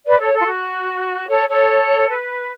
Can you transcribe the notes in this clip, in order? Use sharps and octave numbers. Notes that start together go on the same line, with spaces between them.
B4 D5
A4 C#5
A4
F4
F#4
A4 C#5
A4 C#5
B4